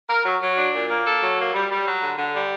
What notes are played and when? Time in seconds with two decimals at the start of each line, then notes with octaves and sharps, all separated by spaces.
0.10 A#4
0.25 F#3
0.41 F#3
0.58 D4
0.74 A#2
0.91 A#3
1.06 A4
1.22 F#3
1.39 A#3
1.54 G3
1.70 G3
1.87 F#3
2.02 D3
2.18 D3
2.35 G3